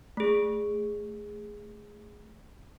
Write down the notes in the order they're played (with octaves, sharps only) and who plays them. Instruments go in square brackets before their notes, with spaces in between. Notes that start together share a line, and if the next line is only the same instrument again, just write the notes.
[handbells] A3 G#4